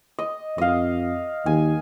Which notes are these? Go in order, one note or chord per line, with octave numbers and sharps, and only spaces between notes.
D#5
F2 D#5 F5
D#2 G#5